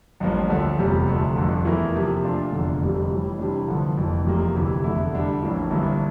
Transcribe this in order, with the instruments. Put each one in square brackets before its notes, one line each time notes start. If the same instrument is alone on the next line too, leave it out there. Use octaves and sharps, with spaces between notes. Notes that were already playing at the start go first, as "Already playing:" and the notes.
[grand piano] A1 G2 F3 A#3
D2 D3 F3 A3
F1 E2 C3 G3 C4
D2 C3 F3 A3
G1 F2 D3 F3
E2 E3 A3 E4 A#4
C3 F3 A#3
A#2 A3 D4 F4
F1 E2 D3 A3 D4
G1 F2 C3 G3
A2 E3 G3
C3 E3 G3 D4
G1 G2 D3 F3 A3
F1 F2 E3 A#3
F1 E2 C3 F3 A#3
D2 C3 E3
F1 E2 D3 A3 E4
D3 G3 D4
A#1 A2 E3 A#3 D4
G1 G2 E3 A#3 E4